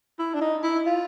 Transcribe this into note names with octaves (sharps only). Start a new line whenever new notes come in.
E4
D4
D#4
E4
F4